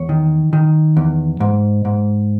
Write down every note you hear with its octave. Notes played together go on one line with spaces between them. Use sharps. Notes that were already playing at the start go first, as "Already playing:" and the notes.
Already playing: E2 C#5
D#3
D#3
E2
G#2
G#2